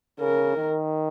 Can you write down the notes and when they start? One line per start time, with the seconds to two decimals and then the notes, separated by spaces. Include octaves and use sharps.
0.20 C#3 A#4
0.57 D#3